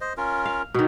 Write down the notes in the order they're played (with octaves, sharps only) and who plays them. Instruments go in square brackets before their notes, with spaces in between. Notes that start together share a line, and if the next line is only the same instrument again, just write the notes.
[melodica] C5 D#5
C#4 F4 A#4
[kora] F5
B2 D#3